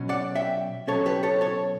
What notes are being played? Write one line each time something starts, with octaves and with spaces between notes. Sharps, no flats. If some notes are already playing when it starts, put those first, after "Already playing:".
Already playing: B2 F#3 C#4
D5 F#5
E5 G5
B2 F#3 C#4 A4 C#5
G4 B4
A4 C#5
A4 C#5